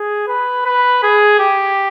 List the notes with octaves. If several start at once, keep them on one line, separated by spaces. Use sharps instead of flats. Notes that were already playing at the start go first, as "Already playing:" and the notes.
Already playing: G#4
B4
B4
G#4
G4